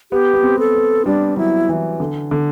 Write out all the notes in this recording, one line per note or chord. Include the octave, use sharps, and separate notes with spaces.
B3 G4
B3
C4
A4
B3
G3 D4
F#3 E4
E3
D3
D3